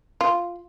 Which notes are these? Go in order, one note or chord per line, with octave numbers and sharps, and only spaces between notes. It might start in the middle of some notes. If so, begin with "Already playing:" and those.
F4